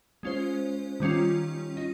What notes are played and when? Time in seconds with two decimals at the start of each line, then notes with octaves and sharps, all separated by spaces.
0.23 G#3 C#4 F4 C5
1.00 D#3 G3 C#4 F4
1.77 D#4